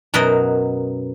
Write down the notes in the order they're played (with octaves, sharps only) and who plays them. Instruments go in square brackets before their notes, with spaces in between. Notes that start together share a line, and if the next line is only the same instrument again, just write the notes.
[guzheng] F#2 B2 F#3 F#4 A#4 D#5